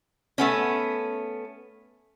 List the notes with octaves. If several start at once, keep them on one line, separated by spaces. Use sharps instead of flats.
A3 B3 C#4